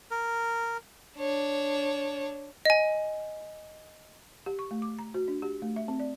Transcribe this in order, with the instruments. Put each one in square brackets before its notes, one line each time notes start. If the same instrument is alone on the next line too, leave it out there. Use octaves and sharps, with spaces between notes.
[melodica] A#4
[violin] D4 C#5
[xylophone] D#5 G#5
[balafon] G4
C#6
A3
D6
A#5
F#4
D4
G4
A3
E5
C4
D5